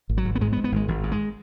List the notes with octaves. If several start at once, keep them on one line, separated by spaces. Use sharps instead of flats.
G#1
F#3
G#1
B3
G#2 G#3
B3
G#2
B3
G#1 G#3
G#1
G#2
G#3